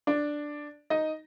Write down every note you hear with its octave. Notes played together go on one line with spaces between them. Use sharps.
D4 D5
D#4 D#5